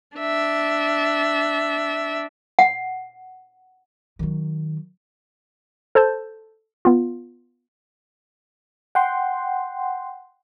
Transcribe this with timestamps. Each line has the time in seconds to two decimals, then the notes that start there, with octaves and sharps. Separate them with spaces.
0.17 D4 E5
2.59 F#5
4.19 D#3 F#3
5.95 A4 C5 A5 G6
6.85 B3 F4
8.95 F#5 G5 C6